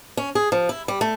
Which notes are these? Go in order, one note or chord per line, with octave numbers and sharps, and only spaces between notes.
C#4
G#4
F3
E4
G3
A3